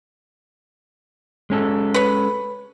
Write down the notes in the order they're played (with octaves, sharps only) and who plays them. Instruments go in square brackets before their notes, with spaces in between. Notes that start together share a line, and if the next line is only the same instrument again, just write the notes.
[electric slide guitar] G#3 C#4 A4
[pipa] B4 C#5